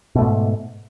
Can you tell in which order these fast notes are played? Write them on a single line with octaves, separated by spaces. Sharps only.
B2 A3 G#2